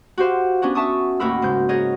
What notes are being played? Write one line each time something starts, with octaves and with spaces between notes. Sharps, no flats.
F#4 G4 C5 F5
B3 C#4 D4 F#4
E5 A5 C#6 D#6
D#2 A2 F#4 A#4 B5 E6
G#2 C#3 G6
F#4 G#4 A#4 C#5 D#5